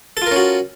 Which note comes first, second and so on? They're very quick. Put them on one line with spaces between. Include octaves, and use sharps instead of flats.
A4 F4 A#4 C#4 F#4